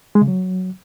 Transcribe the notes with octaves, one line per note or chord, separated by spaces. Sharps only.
G#3
C#3
F#3